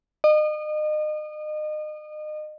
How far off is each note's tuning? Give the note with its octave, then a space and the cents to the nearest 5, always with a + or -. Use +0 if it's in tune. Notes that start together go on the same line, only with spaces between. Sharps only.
D#5 -35